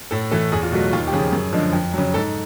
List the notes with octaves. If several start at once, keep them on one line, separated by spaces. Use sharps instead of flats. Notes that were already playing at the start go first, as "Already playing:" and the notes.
A2 A4
E3 A3 A4
E2 G#4
F4
B2 F#3 A3 F#4
D#2 F4
G4
C#3 F3 G#4
F#2
D3 F3 G#3
F2
C#3 F#3
G#2 A4